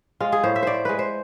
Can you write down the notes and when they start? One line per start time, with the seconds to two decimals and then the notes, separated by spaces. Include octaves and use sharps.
0.20 G#3 F4
0.32 G#4
0.44 A2 C5
0.56 E5
0.63 A2 C5 D5
0.85 G#3 B4
0.99 C5